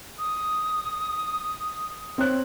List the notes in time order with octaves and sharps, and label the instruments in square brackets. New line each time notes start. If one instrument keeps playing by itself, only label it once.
[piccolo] D#6
[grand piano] C4 C#5 F#6